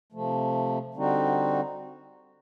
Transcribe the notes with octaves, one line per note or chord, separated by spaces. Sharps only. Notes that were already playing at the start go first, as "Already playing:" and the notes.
C3 F3 A3
D3 G3 C4 D#4 F#4